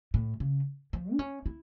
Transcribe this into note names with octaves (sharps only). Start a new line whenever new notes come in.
A2
C#3
F3
D4
C#4
E4